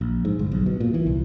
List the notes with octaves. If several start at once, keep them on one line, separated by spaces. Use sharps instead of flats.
A#1
G#2
G1
B1
B2
A#2
E3
C2